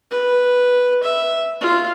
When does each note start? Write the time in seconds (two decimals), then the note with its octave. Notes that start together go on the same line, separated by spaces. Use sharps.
0.11 B4
1.03 E5
1.61 F4